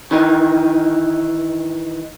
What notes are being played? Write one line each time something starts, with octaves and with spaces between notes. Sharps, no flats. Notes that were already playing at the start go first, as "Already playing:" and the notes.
D#3 E3 D#4